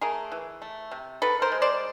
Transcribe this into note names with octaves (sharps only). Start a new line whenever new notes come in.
A3 G#4 A#4
E3
A3
C3
D#3 A4 B4
A#4 C5
G#3
C5 D5